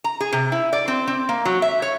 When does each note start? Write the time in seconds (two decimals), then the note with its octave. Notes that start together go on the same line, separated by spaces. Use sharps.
0.04 A#5
0.20 G#4
0.33 C3
0.52 E4
0.73 D5
0.88 C4
1.07 C4
1.29 A#3
1.45 F#3
1.62 E5
1.82 C#5